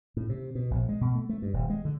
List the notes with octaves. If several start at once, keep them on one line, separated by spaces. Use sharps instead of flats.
A2
C3
B2
A#1
G#3
B2
A3
A3
G2
D#1
G#3
D3